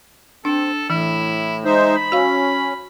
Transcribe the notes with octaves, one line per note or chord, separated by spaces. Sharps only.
C4 D4 A4
A2 E3 E4
G#3 D#4 C5 E5
B5
C#4 F#4 F5